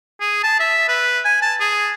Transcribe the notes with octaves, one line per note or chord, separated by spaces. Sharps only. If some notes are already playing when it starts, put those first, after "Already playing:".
G#4
A5
E5
B4
G#5
A5
G#4